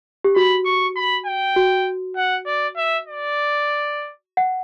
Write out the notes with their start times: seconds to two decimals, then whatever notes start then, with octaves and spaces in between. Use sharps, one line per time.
0.24 G4
0.36 F#4 B5
0.66 C#6
0.96 B5
1.26 G5
1.56 F#4
2.16 F#5
2.46 D5
2.77 E5
3.07 D5
4.37 F#5